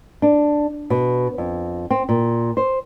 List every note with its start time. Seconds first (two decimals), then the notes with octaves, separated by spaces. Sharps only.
0.22 D4
0.90 B2
1.38 F2
1.91 C4
2.09 A#2
2.57 C5